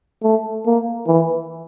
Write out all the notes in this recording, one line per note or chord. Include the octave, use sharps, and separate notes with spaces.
A3
A#3
E3